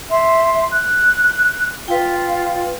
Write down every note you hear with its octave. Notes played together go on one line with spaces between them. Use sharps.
E5 C6
F#6
F4 B4 G5